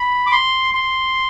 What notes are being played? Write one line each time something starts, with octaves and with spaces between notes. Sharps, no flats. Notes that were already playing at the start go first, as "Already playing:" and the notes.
Already playing: B5
D6
C6
C6